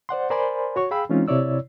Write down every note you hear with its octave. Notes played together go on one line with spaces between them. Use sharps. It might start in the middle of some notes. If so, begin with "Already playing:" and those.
C5 D5 F#5 C6
A#4 C5 D5 G#5 B5 C6
F#4 C#5 C#6
G#4 F5 G5 B5 E6
E3 G#3 C4 C#4 D#4 F4
C3 E4 C#5 D5 E6